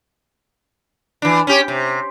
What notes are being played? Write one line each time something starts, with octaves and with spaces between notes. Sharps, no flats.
E3 D4
C#4 G4
C3